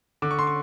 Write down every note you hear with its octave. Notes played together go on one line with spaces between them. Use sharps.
D3 D6
C#6
C6
C#6